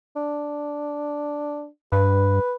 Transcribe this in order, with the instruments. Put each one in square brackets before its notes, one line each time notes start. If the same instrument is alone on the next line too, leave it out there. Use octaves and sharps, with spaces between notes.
[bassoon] D4
[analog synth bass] G2 [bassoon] B4